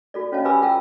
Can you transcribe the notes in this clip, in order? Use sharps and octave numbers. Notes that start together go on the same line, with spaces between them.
F#4 A4 D5
C#4 F#4 C#5 D#5 F5 A5
G4 B4 G#5 B5 D6 E6
F4 A4 G5 A5 A#5 E6